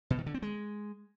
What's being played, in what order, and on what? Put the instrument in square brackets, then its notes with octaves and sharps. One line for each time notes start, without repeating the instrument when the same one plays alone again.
[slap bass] B2
D#3
D3
C4
G#3